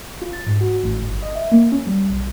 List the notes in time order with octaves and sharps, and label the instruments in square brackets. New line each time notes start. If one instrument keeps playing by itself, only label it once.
[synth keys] F4
A6
G#2
F#4
A1
G1
D#5
E5
A#3
C#4
G3
B1